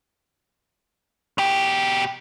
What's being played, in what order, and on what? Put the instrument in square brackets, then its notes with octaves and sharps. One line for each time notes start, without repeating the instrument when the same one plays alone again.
[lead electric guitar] B2 G4